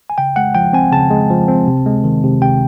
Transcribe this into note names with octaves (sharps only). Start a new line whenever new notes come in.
G#5
C#3 G5
G#3 F#5
F3 G5
C4 G#5
C#3 A5
G#3
F3
C4
C3
G#3
D#3
C3
C3 G5